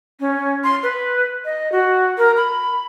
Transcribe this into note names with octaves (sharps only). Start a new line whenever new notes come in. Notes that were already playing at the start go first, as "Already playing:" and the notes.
C#4
C6
B4
D#5
F#4
A#4
B5